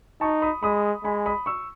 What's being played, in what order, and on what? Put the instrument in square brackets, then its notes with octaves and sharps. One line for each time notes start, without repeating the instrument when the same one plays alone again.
[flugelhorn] D#4 [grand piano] A5 C#6
[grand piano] B5 D#6
[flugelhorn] G#3 [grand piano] B5 D#6
[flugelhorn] G#3 [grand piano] G#5 B5
[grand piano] B5 D#6
C#6 E6